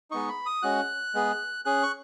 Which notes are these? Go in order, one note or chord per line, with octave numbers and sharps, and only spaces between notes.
G#3 B3 D#4 C#6
B5
D#6
G#3 C#4 F#4 F#6
G#3 B3 G#4
C#4 G#4 F#6
C#6